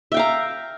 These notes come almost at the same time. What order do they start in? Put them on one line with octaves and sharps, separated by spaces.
E5 G5 F5 A#5